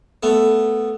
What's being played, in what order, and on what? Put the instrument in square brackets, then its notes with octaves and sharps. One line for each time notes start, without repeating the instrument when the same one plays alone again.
[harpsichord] A3 B3